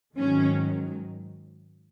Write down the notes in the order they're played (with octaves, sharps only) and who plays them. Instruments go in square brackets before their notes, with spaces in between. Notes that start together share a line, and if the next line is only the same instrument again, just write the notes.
[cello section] G#2 D#3 F#3 C#4